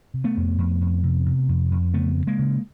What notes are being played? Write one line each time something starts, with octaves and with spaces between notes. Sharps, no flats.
C3
A3 B3
F2
F2
F2
C3
C3
F2
F2
C#3 A3 B3
D2
G#3 A#3
C#3